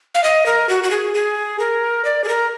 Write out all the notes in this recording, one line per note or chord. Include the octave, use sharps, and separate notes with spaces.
F5
D#5
A#4
F#4
F#4
G#4
G#4
A#4
D5
G#4
A#4